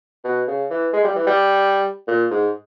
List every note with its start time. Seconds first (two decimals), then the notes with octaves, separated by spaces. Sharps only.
0.24 B2
0.47 C#3
0.70 E3
0.93 G#3
1.04 G3
1.15 E3
1.27 G3
2.07 A#2
2.31 G#2